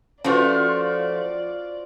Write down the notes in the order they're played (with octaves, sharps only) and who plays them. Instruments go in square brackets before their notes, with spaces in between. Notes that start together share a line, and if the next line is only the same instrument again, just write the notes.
[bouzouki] F3 A3 [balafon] C#4 B4 [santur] F4 F#4 C5 [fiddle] D5